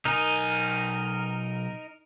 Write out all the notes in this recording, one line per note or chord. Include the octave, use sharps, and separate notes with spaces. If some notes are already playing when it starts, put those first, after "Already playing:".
B1 D#4 A#4 G#5